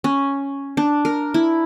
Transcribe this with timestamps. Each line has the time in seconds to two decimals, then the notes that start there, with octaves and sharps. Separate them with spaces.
0.04 C#4
0.77 D4
1.05 A#4
1.34 E4